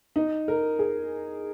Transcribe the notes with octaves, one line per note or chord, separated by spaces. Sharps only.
D#4
A#4
G#4